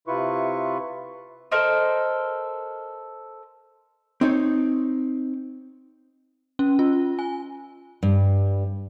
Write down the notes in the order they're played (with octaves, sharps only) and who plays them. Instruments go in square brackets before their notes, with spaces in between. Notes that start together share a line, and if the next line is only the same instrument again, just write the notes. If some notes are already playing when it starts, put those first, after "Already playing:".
[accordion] C3 E4 F4 B4 C#6
[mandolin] A4 A#4 C5 D#5
[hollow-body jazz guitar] C4 D#4 C#5
[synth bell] C#4
F4
G#5
[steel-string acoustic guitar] G2